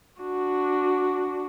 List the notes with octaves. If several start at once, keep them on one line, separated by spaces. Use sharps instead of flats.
D4 F#4